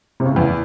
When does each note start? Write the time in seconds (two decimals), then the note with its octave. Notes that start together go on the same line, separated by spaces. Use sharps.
0.20 C3
0.25 C#3
0.31 A2
0.36 E2